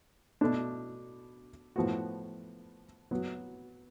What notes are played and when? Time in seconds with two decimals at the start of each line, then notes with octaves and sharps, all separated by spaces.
0.41 B2 A3 D4
1.76 A2 F3 B3 F#4
3.11 F#3 B3 F#4